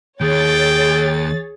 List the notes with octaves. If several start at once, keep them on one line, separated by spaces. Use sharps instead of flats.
D#2 G#4 C#5 G5 A6